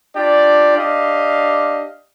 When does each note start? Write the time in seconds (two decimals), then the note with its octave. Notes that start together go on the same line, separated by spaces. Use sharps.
0.16 D4 F4 G4 D5
0.77 D4 G4 D#5 F5